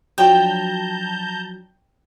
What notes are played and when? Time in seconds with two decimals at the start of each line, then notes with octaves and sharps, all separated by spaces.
0.18 F3 F#3 D4 G5 A5 A#5 G6